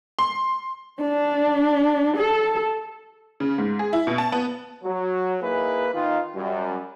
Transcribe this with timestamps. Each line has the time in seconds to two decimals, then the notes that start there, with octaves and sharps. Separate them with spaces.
0.19 C6
1.01 D4
2.17 A4
3.40 C#3
3.58 G#2
3.79 G#4
3.93 E4
4.07 B2
4.18 A5
4.32 B3
4.84 F#3
5.41 A#3 D#4 E4 G#4 B4
5.93 D#3 D#4 F4
6.35 F#2 G3